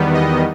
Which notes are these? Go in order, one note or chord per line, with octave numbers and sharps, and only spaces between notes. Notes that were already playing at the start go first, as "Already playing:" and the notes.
Already playing: E2 D#3 G3 B3
D#5